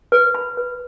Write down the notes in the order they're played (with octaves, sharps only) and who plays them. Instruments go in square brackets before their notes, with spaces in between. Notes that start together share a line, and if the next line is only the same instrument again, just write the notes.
[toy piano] B4
B5
B4